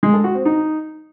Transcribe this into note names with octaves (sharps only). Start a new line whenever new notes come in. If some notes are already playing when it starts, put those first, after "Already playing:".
G#3
A4
F#4
C4
D#4